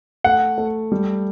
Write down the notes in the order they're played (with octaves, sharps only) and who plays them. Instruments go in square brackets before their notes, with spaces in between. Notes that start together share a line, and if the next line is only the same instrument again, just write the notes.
[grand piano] A3 [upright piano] F#5
[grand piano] A3
G3